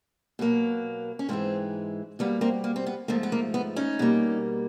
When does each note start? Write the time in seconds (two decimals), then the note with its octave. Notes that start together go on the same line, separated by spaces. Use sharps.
0.39 B2 F#3 A#3
1.19 C#4
1.29 G#2 E3 G#3 A#3 C4
2.19 B2 G3 A#3 B3
2.41 A#3 C4
2.64 A#3
2.76 C4
2.86 B3
3.08 G#2 F3 A3 A#3
3.23 B3
3.32 A#3
3.54 B3
3.76 C#4 D#4
3.99 B2 G3 A#3